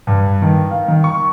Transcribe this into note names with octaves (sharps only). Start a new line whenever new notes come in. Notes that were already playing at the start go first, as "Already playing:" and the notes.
G2
D#3
F5
D#3
C#6